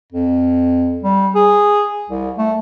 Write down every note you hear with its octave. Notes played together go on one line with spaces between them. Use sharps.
F2
G3
G#4
C2
A3